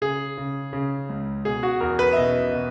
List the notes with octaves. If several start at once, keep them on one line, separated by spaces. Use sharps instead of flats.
C#3 G#4
C#3
C#3
C#2
B2 G#4
F#4
E2 A#4
B4
E5
B2 D#5
B2